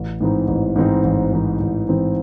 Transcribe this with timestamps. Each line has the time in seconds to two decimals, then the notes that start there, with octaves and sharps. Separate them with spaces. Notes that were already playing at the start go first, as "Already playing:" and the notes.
Already playing: A1
0.21 G#2 E3 C4 D#4
0.48 A1
0.76 G#2 E3 C4 D#4
1.04 A1
1.33 G#2 E3 C4 D#4
1.60 A1
1.89 G#2 E3 C4 D#4